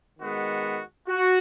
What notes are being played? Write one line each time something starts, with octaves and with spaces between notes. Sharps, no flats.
D#3 G#3 B3 F#4
F#4